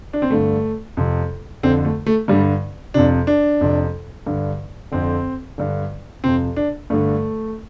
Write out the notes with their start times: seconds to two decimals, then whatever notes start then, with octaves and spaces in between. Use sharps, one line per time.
0.13 D4
0.22 C4
0.30 G2 D3 A3
0.97 F2 C3
1.63 F2 D3 C4
1.85 A3
2.06 A3
2.28 G2 D3 G3
2.94 F2 C3 D4
3.27 D4
3.61 F2 C3
4.26 G2 D3
4.91 F2 D3 C4
5.58 G2 D3
6.24 F2 C3 C4
6.56 D4
6.90 G2 D3 A3